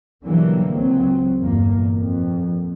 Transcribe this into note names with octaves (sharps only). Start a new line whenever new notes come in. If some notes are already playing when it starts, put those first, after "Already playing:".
B2 D3 E3 F#3 G3 A#3
C#2 F#3 C4
G1 E2 A#2 A#3
F2 A#2